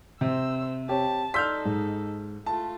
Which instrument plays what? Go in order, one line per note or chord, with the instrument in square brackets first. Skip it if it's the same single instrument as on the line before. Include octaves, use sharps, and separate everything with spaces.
[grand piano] C3 [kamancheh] C5 E6
[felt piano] C4 G4 C#5 [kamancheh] A5
[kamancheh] D#4 A4 [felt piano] D5 C6 E6 [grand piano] F6 G6 B6
[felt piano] G#2
[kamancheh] A3 F4 [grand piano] A5